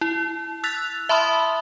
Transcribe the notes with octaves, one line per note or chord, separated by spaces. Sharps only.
E4
E6 F#6 A6 B6 F7
E5 A5 B5 C6 D#6 F6